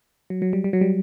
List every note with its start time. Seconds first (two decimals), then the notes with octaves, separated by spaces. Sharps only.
0.30 F#3
0.42 F#3
0.53 G3
0.64 G3
0.73 F#3
0.81 G3